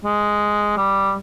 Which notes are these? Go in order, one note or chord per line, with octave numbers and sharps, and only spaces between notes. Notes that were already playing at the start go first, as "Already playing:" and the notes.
G#3
G3